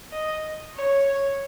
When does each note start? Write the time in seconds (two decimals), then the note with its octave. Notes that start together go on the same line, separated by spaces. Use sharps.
0.10 D#5
0.74 C#5